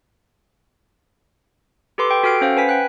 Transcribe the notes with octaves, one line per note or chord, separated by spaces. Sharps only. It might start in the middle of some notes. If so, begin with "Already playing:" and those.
G4 A4 B4 C6 D6
G5
F#4 A4 G5 F6 C7 D7
C#4 C5 F5 F#5
B4 G#5 B6
G5 F#6